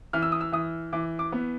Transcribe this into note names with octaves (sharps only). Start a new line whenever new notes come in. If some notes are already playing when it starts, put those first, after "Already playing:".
E3 F6
E6
D#6
E6
E3 D#6
E3 D6
D6
B3